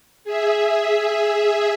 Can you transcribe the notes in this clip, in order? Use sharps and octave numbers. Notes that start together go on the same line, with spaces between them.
G#4 E5